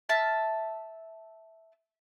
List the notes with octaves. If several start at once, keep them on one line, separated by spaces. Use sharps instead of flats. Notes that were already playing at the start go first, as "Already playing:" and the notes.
E5 A5 F6